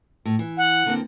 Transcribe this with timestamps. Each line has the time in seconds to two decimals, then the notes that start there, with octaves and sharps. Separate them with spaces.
0.25 A2
0.39 E3
0.57 F#5
0.86 D3 A#3 C4